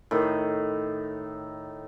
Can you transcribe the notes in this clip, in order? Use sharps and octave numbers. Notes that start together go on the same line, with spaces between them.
A2 D#3